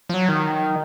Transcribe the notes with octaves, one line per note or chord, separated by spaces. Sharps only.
F3
F#3
D#3